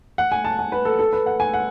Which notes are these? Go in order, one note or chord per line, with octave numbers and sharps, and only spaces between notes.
F#5
G#5
A5
G#5
B4
A4
A4
B4
F#5
G#5
F#5